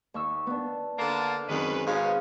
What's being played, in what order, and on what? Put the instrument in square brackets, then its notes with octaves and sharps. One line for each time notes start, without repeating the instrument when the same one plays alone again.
[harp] D#2 C#6 E6
B3 D4
[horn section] D3 A#3 A5
[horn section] F#2 G#3 B4 [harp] D#3 C4
[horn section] G#2 B2 C#4 [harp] G#4 F5 B5